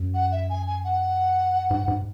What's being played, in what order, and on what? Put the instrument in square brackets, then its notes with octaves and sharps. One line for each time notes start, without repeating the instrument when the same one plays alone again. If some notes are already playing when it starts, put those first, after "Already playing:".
Already playing: [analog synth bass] F#2
[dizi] F#5
E5
G#5
G#5
F#5
[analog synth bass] G#2
G#2